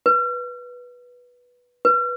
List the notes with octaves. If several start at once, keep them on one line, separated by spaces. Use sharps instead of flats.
B4
B4